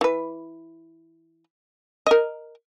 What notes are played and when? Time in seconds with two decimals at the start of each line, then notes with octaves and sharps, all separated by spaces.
0.01 E3 B4
2.07 A#4 D#5